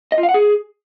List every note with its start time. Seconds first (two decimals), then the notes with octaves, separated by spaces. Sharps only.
0.12 D#5
0.18 F4
0.23 F5
0.29 F#5
0.34 G#4